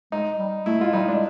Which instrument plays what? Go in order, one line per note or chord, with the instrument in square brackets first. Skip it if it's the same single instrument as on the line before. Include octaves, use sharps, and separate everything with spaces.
[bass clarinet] G#3 [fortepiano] D#4
[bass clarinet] G3
[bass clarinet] A3 [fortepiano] E4
[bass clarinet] G#3 [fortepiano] F4
[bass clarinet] G3 [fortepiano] D#4
[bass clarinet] G#3 [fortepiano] D4